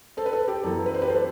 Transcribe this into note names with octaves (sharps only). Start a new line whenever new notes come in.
A4 C5
B4
A4
G4
F#2 E3 B3 A4
B4
C5
G4 B4
A4 C5